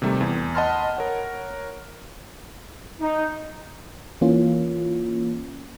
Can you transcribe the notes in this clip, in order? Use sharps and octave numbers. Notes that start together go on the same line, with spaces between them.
C3 D#3 G3 A3 D#4 G4
E2
D#5 F#5 A5 B5 C6 F6
A#4 C#5 F#5
D#4
E3 A#3 C#4 F4